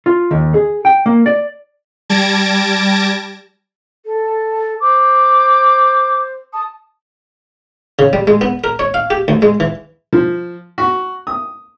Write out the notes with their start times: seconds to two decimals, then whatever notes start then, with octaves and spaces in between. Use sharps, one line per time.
0.06 F4
0.31 D#2
0.54 G#4
0.85 G5
1.06 A#3
1.26 D5
2.09 G3 A5 G#6 A#6 D7
4.06 A4
4.81 C5 D6
6.53 A5 D#6
7.99 C#3
8.13 G3
8.27 G#3
8.41 B3
8.64 A#4
8.79 C#5
8.94 F5
9.10 G4
9.28 D2
9.42 G#3
9.60 E3
10.13 F3
10.78 F#4
11.27 D#6